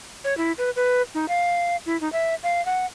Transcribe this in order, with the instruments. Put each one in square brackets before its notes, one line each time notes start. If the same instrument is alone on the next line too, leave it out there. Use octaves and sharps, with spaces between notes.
[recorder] C#5
E4
B4
B4
D#4
F5
E4
D#4
E5
F5
F#5